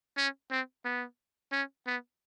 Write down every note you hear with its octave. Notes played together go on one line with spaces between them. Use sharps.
C#4
C4
B3
C#4
B3